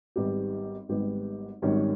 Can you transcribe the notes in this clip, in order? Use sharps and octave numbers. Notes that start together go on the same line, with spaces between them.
G#1 G#2 G3 B3 G4
G#1 G#2 G3 B3 G4
G#1 G#2 D#3 G3 C#4